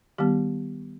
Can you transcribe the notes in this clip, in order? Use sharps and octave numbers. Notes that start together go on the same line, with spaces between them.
D#3 G3 B3 G4